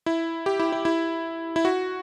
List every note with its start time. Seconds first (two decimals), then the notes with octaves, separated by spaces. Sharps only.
0.06 E4
0.46 G4
0.59 E4
0.72 E4
0.85 E4
1.56 E4
1.65 F#4